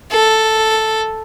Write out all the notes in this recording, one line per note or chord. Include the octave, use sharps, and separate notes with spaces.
A4